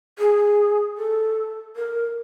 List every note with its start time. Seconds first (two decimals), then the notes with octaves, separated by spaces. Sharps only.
0.19 G#4
0.97 A4
1.76 A#4